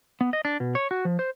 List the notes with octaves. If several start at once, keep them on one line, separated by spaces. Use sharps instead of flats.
B3
D#5
D4
B2
C#5
F#4
F3
C5